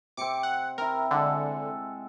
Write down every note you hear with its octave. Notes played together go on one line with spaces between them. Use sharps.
C3 C4 D6 C#7
F#5
C4 E4 A#4
D3 G#3 A4 F#5